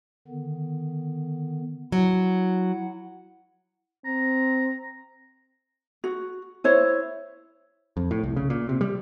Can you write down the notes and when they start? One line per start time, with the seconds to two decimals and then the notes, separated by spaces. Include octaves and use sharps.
0.28 D3 D#3 B3
1.92 F#3 E4 F#5
4.05 C4 A#5
6.04 F#4
6.64 E4 C5 C#5
7.97 F2
8.11 A2
8.23 C2
8.36 C#3
8.50 A#2
8.69 C3
8.81 G3